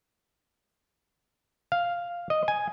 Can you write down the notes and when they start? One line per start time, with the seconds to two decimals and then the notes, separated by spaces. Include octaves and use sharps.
1.72 F5
2.30 D#5
2.48 G#5